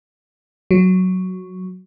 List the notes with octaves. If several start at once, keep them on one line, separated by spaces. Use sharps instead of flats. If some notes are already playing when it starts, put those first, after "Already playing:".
F#3